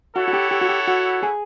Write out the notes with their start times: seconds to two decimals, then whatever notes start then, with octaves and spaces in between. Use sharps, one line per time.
0.16 E4 F#4 A4 C#5 F#5
0.28 F#4
0.33 G4
0.51 G4
0.61 F#4
0.69 G4
0.88 F#4
1.23 G#4